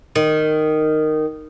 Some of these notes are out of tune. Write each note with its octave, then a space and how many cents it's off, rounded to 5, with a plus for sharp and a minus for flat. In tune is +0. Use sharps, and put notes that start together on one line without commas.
D#3 -10